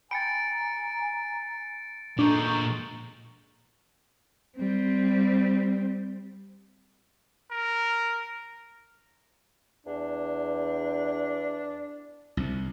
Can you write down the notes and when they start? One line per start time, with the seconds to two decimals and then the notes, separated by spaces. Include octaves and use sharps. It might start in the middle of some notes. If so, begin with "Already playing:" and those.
0.11 G5 G#5 A#5 B5 A6 C#7 D7
2.19 A#2 G#3 D4 A4 A#5 C#6 G6
4.57 G3 C4
7.51 A#4
9.86 E2 D4
12.37 C2 C3